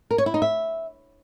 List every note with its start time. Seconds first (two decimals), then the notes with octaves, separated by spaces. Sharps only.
0.11 A#4
0.18 C#5
0.26 E4
0.34 D#4
0.42 E5